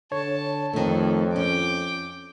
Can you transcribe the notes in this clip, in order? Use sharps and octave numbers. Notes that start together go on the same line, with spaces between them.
D3 C#5 A5
F2 D#3 A3 A4
C#4 G5 D6